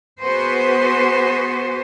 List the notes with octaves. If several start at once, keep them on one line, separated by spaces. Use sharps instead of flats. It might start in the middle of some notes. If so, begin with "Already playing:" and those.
B3 F#4 G#4 B4 C5